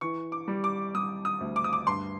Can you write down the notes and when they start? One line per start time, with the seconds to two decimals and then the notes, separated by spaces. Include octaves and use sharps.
0.01 E3 C#6
0.32 D6
0.48 G3
0.64 D6
0.95 G3 D#6
1.25 D#6
1.41 D2
1.56 D6
1.64 D#6
1.73 D6
1.87 G2 C6